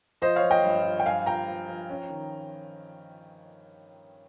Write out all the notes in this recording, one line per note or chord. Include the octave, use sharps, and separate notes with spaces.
F3 C5 D#5
C#5 F5
F3
D#5 G5
G2
F3
G5
G2 F5 G#5
F3 G5 A#5
F3
F3
C#4
D#3